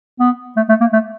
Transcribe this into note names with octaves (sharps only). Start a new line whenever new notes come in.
B3
A3
A3
A#3
A3